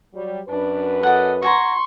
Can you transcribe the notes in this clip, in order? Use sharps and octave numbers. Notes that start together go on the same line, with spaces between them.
F#3 G3
F#2 D4 B4
A4 D5 D#5 F#5
F#4 G#5 A#5 C6 C#6